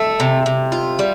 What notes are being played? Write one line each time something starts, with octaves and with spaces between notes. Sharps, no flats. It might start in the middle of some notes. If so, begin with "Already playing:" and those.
Already playing: A3 E5
C3
C3
F4
G3